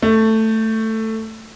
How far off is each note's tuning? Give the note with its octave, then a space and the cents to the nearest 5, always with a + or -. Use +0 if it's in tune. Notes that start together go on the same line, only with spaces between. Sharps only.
A3 +10